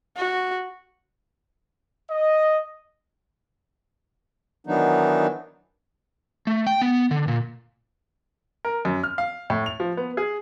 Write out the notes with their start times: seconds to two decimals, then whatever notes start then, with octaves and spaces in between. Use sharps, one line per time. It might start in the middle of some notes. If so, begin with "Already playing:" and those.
0.17 F#4
2.10 D#5
4.67 D#3 E3 F#3 B3 D4 D#4
6.47 A3
6.67 G5
6.82 B3
7.11 D3
7.28 A#2
8.65 A#4
8.85 F#2
9.03 F6
9.18 F5
9.50 A2
9.66 F7
9.80 F3
9.97 B3
10.17 G#4